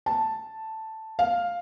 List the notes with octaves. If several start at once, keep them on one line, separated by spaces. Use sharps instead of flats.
A5
F5